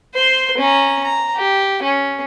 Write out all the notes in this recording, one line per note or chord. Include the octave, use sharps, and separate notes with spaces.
C5 C6
C#4 A#5
A#5
G4
C#4